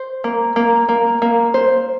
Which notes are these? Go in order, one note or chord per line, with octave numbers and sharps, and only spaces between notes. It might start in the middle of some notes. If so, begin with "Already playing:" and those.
Already playing: C5
A#3
A#3
A#3
A#3
C5